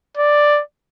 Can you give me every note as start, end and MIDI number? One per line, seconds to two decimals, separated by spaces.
0.17 0.61 74